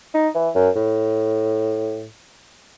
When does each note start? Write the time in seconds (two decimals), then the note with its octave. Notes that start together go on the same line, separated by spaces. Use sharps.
0.14 D#4
0.35 E3
0.55 F#2
0.76 A2